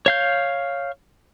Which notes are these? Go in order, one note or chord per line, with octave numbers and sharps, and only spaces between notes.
C#5 F5 G6